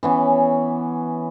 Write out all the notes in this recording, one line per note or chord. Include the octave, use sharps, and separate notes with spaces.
E3 B3 C#4